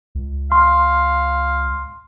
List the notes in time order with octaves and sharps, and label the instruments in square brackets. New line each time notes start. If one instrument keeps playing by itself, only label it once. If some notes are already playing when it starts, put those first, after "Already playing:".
[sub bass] C#2
[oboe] F5 [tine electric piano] C6